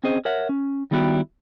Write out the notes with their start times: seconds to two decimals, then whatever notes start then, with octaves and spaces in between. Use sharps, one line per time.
0.04 C4 C#4 G#4 C5 D#5
0.25 A#4 C#5 E5 F#5
0.49 C#4
0.91 D#3 G3 B3 E4 F#4 G4